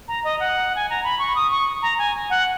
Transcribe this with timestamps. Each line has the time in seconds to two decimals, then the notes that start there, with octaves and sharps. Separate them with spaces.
0.08 A#5
0.24 D#5
0.40 F#5
0.75 G#5
0.90 A#5
1.04 B5
1.19 C#6
1.35 D#6
1.51 C#6
1.82 A#5
1.99 G#5
2.30 F#5